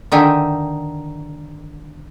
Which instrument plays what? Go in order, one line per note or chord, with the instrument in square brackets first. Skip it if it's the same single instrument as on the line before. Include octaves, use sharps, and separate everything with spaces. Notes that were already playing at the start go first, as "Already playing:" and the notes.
[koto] D3 D#3 D#4 E5 G5 G#5